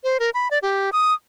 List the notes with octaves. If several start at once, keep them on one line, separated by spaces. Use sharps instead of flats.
C5
A#4
B5
D5
G4
D#6